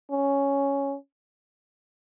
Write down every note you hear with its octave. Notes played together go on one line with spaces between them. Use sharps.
C#4